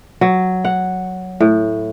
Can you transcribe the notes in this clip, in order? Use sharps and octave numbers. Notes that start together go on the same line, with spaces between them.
F#3
F#5
A2